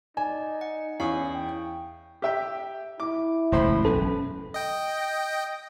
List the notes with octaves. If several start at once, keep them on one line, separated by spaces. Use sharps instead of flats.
D#4 D5 G#5
F#5
E2 C#4 F5 C#6 D#6
G5
G4 E5 G5
E4 D6
E1 C#2 F#2 A2 C5 B5
F#1 B1 C#4 A4 B4
D#5 G5